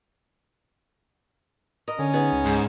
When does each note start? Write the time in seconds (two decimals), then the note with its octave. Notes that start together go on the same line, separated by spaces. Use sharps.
1.88 A#4 D#5
1.99 D3 C#4
2.13 B3 D#4 G#4
2.32 C#2
2.45 G#2